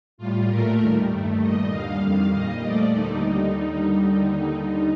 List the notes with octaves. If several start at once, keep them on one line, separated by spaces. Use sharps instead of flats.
A2 G3 F4
A#2 A3 A#4
D#2 D#3 G3
G2 D#3 A3
A#2 G3 D#5
D#2 D3 G3 F5
F2 D#3 G3
A#2 G3 D#5
A#2 F3 A3 D5
D#2 D3 G3 D#4